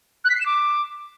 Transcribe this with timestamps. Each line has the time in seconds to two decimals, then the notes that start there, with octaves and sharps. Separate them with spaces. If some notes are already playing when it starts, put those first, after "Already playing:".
0.24 F#6
0.29 B6
0.35 C7
0.40 E7
0.45 D6